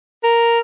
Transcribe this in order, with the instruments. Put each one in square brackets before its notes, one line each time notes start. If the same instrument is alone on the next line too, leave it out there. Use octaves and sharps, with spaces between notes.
[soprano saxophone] A#4